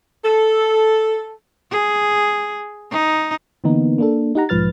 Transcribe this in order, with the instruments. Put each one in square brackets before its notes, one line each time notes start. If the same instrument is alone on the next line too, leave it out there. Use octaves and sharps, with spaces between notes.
[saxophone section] A4
[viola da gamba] G#4
D#4
[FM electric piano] D3 E3 A#3 B3 D#4
A#3 D4 A4
D#4 G4 F#5 A#5
B1 G#2 F3 B4 F6 A6